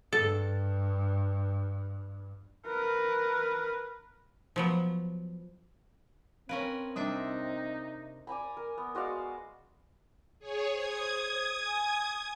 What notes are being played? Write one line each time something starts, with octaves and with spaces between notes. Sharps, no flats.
G2 A4
A#4 B4
F3 F#3 B3
C4 C#4 A#4 B4 F5
C3 G3 D4 D#4 E5
D5 G#5 A#5 B5
A#4
B3
G#3 F#4 D5 F5
G#4 C#5
C5 D#6 G#6
G#5